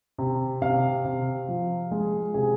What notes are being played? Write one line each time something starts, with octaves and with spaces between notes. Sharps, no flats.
C3
C3 F5
C3
F3
G#3
C3 G#4